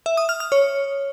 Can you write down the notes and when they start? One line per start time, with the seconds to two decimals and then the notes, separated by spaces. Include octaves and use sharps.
0.06 E5
0.17 D#6
0.29 F6
0.40 F6
0.52 C#5